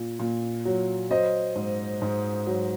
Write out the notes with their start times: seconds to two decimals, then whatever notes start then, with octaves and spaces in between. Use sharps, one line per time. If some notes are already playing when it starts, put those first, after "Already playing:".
Already playing: A#2
0.19 A#2
0.65 F#3
1.10 F#3 C5 D#5
1.56 G#2
2.02 G#2
2.47 F#3